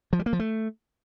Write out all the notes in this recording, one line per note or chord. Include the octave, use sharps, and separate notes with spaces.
F3
G3
A#3
F3
A3